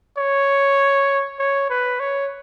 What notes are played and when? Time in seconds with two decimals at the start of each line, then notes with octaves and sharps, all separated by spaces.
0.18 C#5
1.39 C#5
1.70 B4
2.00 C#5